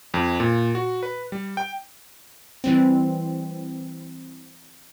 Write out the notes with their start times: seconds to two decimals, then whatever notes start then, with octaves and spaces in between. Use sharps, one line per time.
0.14 F2
0.40 A#2
0.75 F#4
1.03 B4
1.32 G3
1.57 G5
2.64 E3 G3 C4